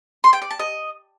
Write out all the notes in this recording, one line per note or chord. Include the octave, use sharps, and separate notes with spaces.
C6
G5
D5
A5
D#5